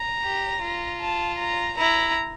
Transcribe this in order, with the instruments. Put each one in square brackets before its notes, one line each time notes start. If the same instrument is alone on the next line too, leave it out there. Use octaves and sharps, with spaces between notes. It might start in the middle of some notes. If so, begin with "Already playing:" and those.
Already playing: [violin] A#5
[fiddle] G4
F4
[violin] A5
A#5
[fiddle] E4 [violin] A#5